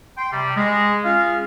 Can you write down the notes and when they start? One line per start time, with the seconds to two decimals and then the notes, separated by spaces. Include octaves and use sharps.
0.18 G5 C6
0.32 C3 G3
0.56 G#3
1.05 C#4 F4 G#4 F5